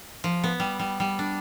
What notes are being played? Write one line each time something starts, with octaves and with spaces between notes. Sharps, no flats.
F3
B3
G3
G3
G3
D4